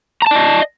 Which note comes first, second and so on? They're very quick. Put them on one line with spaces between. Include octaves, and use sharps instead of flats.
A#5 A5 D5 D#5